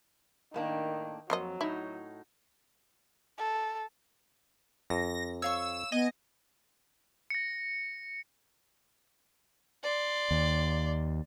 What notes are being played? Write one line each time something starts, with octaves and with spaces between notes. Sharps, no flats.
A2 D#3 A#3 D4
F2 F#3 A#3 C4 D#5
A2 D#4 E4
A4
F2 A#6
C#5 F5 C#6 E6
B3 D#5 G#5
A#6 C#7
D5 C6
D#2